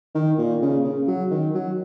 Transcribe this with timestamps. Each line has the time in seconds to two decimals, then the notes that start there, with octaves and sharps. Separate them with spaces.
0.15 D#3
0.38 A#2
0.62 C#3
0.84 C#3
1.08 F#3
1.31 D#3
1.55 F#3